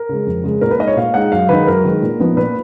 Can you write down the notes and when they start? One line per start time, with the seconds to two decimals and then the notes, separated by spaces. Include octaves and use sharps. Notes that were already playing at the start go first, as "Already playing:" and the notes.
Already playing: A#4
0.09 C#3 G#3
0.26 F2
0.44 C#3 G#3
0.61 A#2 A#4
0.71 B4
0.79 G#3 D#4 D#5
0.88 C#5
0.96 A#2 F5
1.14 G#3 D#4 F#5
1.32 F#2 F5
1.49 D#3 G#3 D#4 B4
1.67 F#2 A#4
1.84 D#3 G#3 D#4
2.02 A#2
2.19 F3 B3 D#4
2.37 A#2 B4